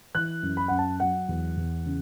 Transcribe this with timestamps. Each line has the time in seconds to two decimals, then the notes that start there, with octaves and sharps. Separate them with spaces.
0.15 E3 F#6
0.43 F#2
0.57 B5
0.68 F#2 F#5
0.78 A5
1.00 F#3 F#5
1.29 E2
1.57 E2
1.86 C#3